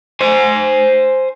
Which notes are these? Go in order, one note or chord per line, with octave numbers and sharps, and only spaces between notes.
C5 G#5